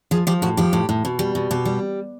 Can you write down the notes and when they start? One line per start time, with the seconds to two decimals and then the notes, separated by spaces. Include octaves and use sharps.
0.11 F3 G#4
0.27 F3 G4
0.42 A2 F#4
0.57 F3 G4
0.73 A2
0.89 A2
1.05 B2
1.19 G3
1.35 B2
1.51 B2 G4
1.65 G3